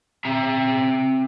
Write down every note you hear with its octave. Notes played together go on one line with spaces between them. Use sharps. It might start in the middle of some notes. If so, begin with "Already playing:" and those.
C4 E5 A#5